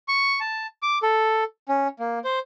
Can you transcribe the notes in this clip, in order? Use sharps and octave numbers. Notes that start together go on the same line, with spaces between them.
C#6
A5
D6
A4
C#4
A#3
C5